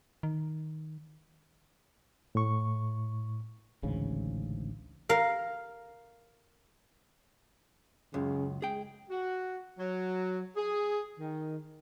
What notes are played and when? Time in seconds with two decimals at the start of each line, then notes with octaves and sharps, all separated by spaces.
0.23 D#3
2.35 A2 C#6
3.83 A1 D2 G#2 C#3
5.09 A#4 F5
8.14 C#2 F#2 C#3
8.62 G#3 G#4 G5
9.10 F#4
9.79 F#3
10.56 G#4
11.18 D#3